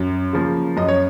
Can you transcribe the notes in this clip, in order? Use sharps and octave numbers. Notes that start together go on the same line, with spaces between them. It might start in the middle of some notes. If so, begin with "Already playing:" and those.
Already playing: F#2
C#3 F3 A#3
F#2 D#5
C#5